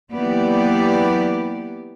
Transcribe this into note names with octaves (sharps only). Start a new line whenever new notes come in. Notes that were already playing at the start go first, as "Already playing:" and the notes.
E3 F#3 A#3 B3 G4 D5